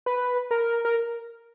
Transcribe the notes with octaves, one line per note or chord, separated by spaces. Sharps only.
B4
A#4
A#4